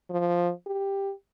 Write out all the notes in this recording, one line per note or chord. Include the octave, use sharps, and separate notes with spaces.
F3
G4